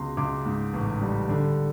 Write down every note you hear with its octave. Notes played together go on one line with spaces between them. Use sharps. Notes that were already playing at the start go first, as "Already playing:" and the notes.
Already playing: C#2 B2 A#5 C6
C#2 C6 D6
G#2
A1
G3
D3